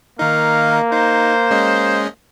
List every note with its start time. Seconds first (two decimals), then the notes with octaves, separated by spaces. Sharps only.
0.19 D#3 A#3 D#4 F5
0.91 D#4 C5
1.51 G#3 C#4 D#5